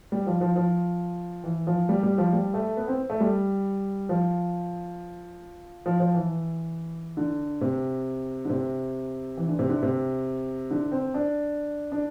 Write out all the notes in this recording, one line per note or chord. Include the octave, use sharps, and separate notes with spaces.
G3
F3
F3
F3
E3
F3
G3
G3
F3
G3
A3
B3
C4
A3
G3
F3
F3
F3
E3
D3
C3
D3
C3
E3
D3
C3
D3
C3
D3
C4
D4
D4